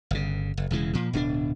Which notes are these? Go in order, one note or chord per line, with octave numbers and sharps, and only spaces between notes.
G1 C#3
F#1
E1 C#3 E3 G#3
A#2 F3
D1 B2 C4 D4